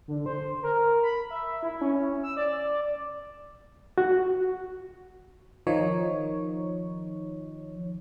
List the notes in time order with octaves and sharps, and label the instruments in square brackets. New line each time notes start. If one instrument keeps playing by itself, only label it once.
[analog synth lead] D3
C5
A#4
B5
E5
E4
C#4
E6
D5
[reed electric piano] F#4
[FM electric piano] D#3 F3 D#4 C#5